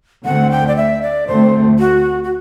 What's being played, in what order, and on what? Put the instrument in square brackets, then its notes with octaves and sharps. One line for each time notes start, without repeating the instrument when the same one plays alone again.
[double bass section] D2 D3 A3 C4 [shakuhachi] F#5
[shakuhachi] G5
D5
E5
D5
[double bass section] D2 D3 A3 C4 [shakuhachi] C5
[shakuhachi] F#4
F#4